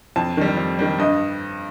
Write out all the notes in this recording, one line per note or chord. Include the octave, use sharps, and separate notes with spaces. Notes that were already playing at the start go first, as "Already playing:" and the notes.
F2 A5
D#3 G3
F2
D#3 G3
G2 D#5